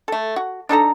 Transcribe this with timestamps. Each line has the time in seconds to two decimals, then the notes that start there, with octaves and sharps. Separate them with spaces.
0.08 A3 A4
0.36 F#4
0.69 D4 D#4 A4 A#5